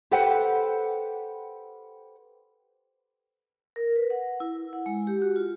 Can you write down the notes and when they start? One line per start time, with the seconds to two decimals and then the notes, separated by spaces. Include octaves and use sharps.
0.11 G4 A4 B4 C5 F#5 G5
3.76 A#4
3.96 B4
4.10 F#5
4.40 E4
4.73 F#5
4.86 G#3
5.07 G4
5.22 F#4
5.36 F4